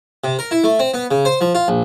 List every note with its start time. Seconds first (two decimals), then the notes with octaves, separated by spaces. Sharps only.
0.24 C3
0.39 A#4
0.51 E4
0.64 A3
0.79 C4
0.94 B3
1.11 C#3
1.25 C5
1.41 F3
1.55 F4
1.68 A#1